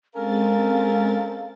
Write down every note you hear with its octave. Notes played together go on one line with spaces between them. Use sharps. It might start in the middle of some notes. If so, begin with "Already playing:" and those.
G#3 C4 C#4 A4 A#4 F5 A6